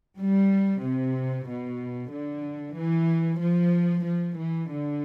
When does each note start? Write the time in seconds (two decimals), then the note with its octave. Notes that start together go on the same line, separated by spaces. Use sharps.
0.19 G3
0.83 C3
1.48 B2
2.12 D3
2.75 E3
3.40 F3
4.05 F3
4.37 E3
4.69 D3